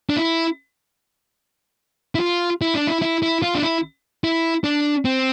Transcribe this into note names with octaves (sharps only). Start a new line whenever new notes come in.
D4
E4
E4
F4
E4
D4
E4
E4
E4
F4
D4
E4
E4
D4
C4